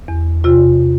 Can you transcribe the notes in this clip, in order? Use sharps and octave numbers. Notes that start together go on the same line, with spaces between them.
E2
C3 F4